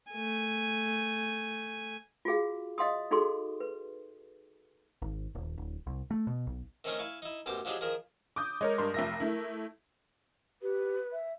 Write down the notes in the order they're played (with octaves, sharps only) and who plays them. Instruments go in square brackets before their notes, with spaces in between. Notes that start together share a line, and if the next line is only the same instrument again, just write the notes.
[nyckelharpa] A3 G#5
[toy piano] F4 F#4 G#4 F5
D#5 F5 C6 D#6
D#4 F#4 G#4 A4 C6 C#6
B4
[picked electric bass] G#1
D#1
D1
C2
A3
B2
B1
[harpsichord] D#3 A3 C4 C#4 D#4 A#4
E4 F5 G#5 C#6
D#4 E4
B1 F#2 A2 G4 C5 D6
F3 F#3 D4 D#4 G4 G#4
D#3 F3 G#4 A#4
[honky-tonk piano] D6 D#6 G6
[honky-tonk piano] G#3 [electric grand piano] A#4 C#5 D#5
[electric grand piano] G2 A#4 C6
[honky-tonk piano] F1 E5 A#6 [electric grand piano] A#4
[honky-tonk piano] A3 E4
[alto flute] G4 [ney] B4
[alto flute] E5